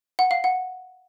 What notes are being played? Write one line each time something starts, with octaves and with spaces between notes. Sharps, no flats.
F#5
F5
F#5